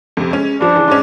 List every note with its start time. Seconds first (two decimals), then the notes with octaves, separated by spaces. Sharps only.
0.17 F2 C3
0.31 G#3 C#4
0.61 G2 F3 D4
0.75 C#3 E3
0.88 G#2 G#3 C#4